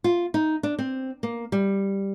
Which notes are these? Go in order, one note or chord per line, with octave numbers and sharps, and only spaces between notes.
F4
D#4
D4
C4
A#3
G3